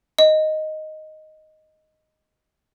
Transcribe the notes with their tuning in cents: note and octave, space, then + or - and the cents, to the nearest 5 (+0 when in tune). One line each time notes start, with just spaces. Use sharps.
D#5 +0